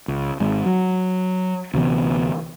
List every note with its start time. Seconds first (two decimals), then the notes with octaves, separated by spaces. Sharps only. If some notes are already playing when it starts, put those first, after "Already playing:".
0.08 C#2
0.40 G#1 G#3
0.66 F#3
1.74 D2 C3 E3 B3